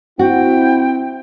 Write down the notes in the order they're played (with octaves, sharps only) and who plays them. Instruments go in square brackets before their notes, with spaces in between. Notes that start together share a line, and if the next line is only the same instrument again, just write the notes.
[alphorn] C4 [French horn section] E4 [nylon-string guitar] F#4 [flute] G5